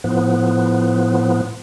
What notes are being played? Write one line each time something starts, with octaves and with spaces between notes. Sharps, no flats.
A2 F3 B3